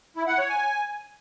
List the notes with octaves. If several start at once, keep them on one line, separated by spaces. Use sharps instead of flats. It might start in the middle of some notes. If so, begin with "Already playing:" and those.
E4
F#5
C#5
G#5